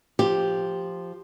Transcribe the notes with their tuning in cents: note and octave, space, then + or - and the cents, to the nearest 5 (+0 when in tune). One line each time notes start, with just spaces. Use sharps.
F3 +0 G4 +0